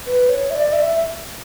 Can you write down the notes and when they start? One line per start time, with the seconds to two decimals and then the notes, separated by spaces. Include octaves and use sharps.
0.07 B4
0.29 C#5
0.50 E5
0.55 D5
0.73 E5